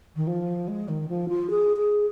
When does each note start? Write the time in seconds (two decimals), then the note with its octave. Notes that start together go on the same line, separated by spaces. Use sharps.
0.16 D#3
0.27 F3
0.68 G#3
0.88 D#3
1.09 F3
1.28 F4
1.50 G#4
1.76 G#4